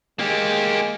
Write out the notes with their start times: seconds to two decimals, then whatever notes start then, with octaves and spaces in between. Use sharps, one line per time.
0.19 G#3 A#3 G4